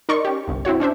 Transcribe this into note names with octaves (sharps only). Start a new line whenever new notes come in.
D#4 A#4 D5 D#5 C6 C#6
C#4 G4
G1 C2
C4 E4 F#4 C#5
C#4 D4 C5 E5